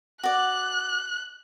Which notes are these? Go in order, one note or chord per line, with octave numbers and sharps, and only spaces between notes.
F#4 D5 F#6